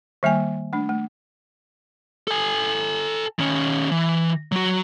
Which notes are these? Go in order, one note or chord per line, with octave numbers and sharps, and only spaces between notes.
D#3 G3 A#3 G#5
A3 D4
A3
A4 G#5
D#3 C#4
E3
F#3 F#4